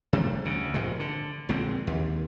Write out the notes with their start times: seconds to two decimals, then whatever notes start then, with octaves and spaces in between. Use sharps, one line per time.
0.13 C3 G3 A3
0.44 D2 C#3
0.74 A#1 G#2 C3 G#3
1.00 D3
1.49 A#1 D3 G#3 C4
1.87 D#2